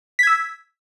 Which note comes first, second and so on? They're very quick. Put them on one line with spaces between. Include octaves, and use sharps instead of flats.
B6 G#6 E6